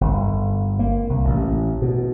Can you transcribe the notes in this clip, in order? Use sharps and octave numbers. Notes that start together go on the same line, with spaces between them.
G1
A#3
C2
A1
B2